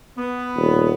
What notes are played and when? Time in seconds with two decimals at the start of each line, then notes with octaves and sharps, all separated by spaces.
0.18 B3
0.57 D#1